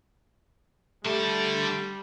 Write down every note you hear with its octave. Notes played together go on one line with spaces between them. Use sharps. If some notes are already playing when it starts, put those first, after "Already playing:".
D3 G3 A3 G4 A5